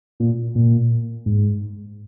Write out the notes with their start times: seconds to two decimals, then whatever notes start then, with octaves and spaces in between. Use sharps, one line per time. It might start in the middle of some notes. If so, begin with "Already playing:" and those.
0.20 A#2
0.55 A#2
1.26 G#2